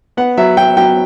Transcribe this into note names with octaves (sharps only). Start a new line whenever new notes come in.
B3 F#5
F#3 E5
F#3 G5
F#3 G5